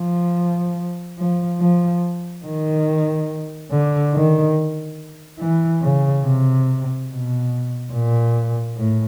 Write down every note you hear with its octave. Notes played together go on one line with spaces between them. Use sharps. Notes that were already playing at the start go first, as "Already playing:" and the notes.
Already playing: F3
F3
F3
D#3
D3
D#3
E3
C#3
C3
B2
A#2
A2